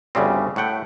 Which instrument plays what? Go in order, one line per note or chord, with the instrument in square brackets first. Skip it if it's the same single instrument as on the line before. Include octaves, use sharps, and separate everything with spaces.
[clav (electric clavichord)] G1 D2 C#3 G3 C4
A2 A3 F#5 G5